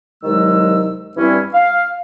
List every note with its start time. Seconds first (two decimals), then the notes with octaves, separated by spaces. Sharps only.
0.24 C2 D#3 F#3 G#3 E6
1.17 G2 E3 G3 C4 C#4 E4
1.53 F5